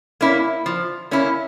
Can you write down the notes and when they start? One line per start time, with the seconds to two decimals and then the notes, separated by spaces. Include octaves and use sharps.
0.21 A#3 C#4 E4
0.66 F3
1.11 A#3 C#4 E4